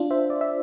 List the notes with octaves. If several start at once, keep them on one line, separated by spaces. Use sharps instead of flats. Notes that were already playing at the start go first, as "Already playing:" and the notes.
Already playing: D4 F4
C5 E5
D5
E5